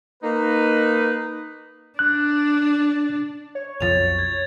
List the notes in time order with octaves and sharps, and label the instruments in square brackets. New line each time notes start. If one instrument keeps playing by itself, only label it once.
[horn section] A#3 D#4 B4
[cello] D4 [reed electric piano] F#6
[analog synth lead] C#5
[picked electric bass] B1 F2 F3 [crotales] A6 F7
[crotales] G#6